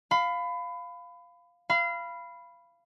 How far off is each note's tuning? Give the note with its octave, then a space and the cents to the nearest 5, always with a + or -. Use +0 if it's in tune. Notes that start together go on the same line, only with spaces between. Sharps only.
F5 +5 B5 +25
F5 -25 B5 +0